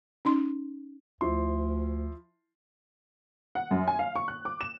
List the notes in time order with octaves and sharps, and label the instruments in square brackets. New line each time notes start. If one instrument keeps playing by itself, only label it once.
[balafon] C#4 D#4 C6
[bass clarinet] D2 [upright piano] F3 E4 C6
[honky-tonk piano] F#5
F#2
G#5
F5
C#6
F#6
D6
E7